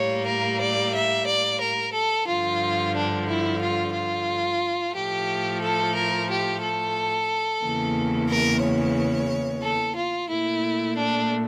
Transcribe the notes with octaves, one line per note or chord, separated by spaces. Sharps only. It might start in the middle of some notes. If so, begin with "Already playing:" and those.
Already playing: A2 G3 A#3 C#5
A#4
D5
E5
D5
A#4
A4
G2 D3 F3 F4
D4
E4
F4
F4
A2 F3 A3 G4
A4
A#4
G4
A4
E2 C#3 E3 A#3
A#4
C#5
A4
F4
A#2 A3 E4
D4